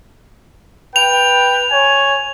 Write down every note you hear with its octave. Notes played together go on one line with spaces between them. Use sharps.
B4 G5 F7
C#5 G#5